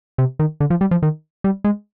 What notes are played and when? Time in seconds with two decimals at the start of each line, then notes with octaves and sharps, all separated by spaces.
0.18 C3
0.39 D#3
0.60 D3
0.70 F3
0.81 G3
0.91 F3
1.03 D#3
1.44 G3
1.64 G#3